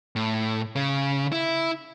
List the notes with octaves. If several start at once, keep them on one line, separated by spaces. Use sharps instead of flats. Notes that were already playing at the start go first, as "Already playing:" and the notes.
A2
C#3
E4